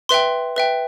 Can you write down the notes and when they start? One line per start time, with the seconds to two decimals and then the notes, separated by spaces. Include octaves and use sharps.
0.09 B4 E5 G5 C6
0.56 B4 E5 G5